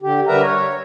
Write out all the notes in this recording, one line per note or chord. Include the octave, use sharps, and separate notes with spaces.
D3 G4
D3 G3 A#4 B4 E5 A#5
C#5